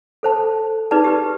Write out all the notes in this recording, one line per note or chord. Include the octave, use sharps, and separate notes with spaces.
A4 C5 A5
D#4 G#4 B4 D5 A5
G4 B4